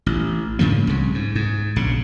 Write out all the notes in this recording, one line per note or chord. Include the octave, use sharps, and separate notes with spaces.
A1
G#2 C#3 F3 A#3
C2 C#3
G#2
G#2
A#1 C#3